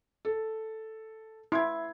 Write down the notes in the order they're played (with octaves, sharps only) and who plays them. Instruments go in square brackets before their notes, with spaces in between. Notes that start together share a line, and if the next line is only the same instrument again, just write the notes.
[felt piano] A4
[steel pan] E4 [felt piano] C6 G#6